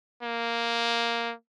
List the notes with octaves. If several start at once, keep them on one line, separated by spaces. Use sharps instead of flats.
A#3